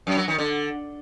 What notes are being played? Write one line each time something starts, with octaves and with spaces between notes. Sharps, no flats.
F#2
F#3
D#3
D3